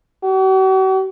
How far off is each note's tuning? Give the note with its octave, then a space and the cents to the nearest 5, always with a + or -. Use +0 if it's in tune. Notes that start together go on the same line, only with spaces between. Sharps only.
F#4 +45